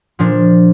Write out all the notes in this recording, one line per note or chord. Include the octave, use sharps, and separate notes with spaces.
A#2 F3 D4